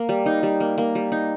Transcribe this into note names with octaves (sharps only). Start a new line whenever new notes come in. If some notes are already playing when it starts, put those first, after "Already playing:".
Already playing: A#3
G3
D#4
G3
A#3
A#3
G3
D#4